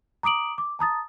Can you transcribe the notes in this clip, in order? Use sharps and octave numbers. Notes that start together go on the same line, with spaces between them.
A#5 D6 D#6 D7 F#7
D6
A5 A#5 D#6 A6